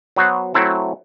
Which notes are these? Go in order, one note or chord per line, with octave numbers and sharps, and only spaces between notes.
F#3 B3 F#4 C5
F#3 A3 C4 E4 A4